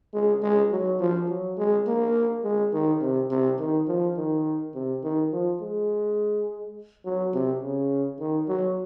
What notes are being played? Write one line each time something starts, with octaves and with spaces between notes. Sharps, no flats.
G#3
G#3
F#3
F3
F#3
G#3
A#3
G#3
D#3
C3
C3
D#3
F3
D#3
C3
D#3
F3
G#3
F#3
C3
C#3
D#3
F#3